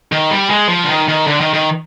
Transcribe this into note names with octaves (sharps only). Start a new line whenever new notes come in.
D#3
G3
G#3
F3
D3
D#3
D#3
D3
D#3
D#3